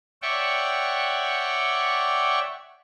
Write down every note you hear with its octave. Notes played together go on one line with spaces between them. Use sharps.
C#5 D5 E5 F#5 G5 C#6